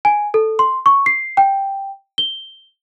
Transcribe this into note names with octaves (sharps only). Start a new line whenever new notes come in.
G#5
A4
C6
C#6
C7
G5
G7